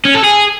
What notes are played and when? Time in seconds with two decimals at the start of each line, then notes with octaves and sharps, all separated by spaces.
0.05 C#4
0.14 A4
0.24 G#4